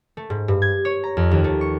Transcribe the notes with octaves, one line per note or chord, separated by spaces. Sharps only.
A3
G#2
G2
G#6
C#5
A#5
F2
D#2
A3
C#6